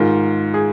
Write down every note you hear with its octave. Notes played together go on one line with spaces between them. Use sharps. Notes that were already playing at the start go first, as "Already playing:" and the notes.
Already playing: G#2 D#3 F4
G#4